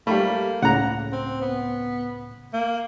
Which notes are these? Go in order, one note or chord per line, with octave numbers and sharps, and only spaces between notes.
G3 A3 A#3 B5
C#2 A2 C#3 F#5 A#5
C4
B3
A#3